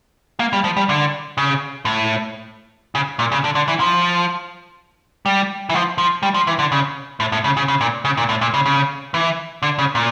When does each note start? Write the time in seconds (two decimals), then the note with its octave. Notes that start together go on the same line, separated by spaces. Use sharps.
0.40 A#3
0.53 G3
0.64 F3
0.77 G3
0.89 D3
1.38 C#3
1.85 A2
2.95 C#3
3.19 A#2
3.32 C#3
3.44 D3
3.55 D3
3.68 E3
3.80 F3
5.26 G3
5.70 E3
5.74 F3
5.98 F3
6.23 G3
6.34 F3
6.47 E3
6.59 D3
6.72 C#3
7.20 A2
7.32 A2
7.44 C#3
7.57 C#3
7.68 C#3
7.81 A#2
8.05 C#3
8.17 A#2
8.29 A2
8.41 A#2
8.54 C#3
8.66 C#3
9.14 E3
9.63 D3
9.79 C#3
9.95 A#2